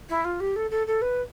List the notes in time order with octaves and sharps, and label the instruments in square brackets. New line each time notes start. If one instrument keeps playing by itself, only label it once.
[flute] E4
F4
G4
A4
A4
A4
B4